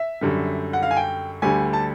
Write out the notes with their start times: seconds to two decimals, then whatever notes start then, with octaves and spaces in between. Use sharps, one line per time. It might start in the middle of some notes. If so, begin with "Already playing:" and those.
Already playing: E5
0.21 F#2 D3 G3
0.73 F#5
0.83 F5
0.91 G#5
0.97 G5
1.42 D2 D3 G3 G#5
1.73 A5